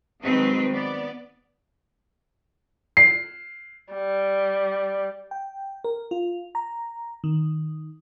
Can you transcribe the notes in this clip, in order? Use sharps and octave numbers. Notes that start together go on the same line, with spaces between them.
D#3 F#3 G#3 C4 B4
B3 D5
C7
G3
G5
A#4
F4
A#5
D#3